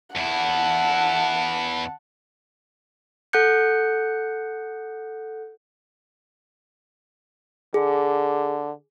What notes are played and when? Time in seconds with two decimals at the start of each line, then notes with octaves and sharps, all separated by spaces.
0.16 E2 E4 F#5 A5
3.33 A4 F#5 F#6 G6 C#7
7.74 D3 G#4